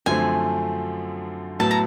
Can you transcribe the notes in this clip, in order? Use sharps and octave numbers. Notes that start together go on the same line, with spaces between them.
F#2 D3 F3 A3 C4 G#5
A2 F#3 B3 A5
A#5